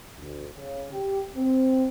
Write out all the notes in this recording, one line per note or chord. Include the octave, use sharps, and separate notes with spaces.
D2
C#3
G4
C4